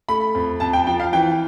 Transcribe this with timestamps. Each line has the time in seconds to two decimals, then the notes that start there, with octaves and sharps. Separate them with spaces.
0.08 A3 B5
0.35 F2
0.60 F2 A5
0.73 G5
0.87 F3 G5
1.00 F5
1.13 E3 G5